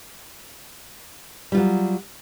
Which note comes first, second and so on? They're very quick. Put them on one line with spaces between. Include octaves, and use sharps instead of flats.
G3 F4 F#3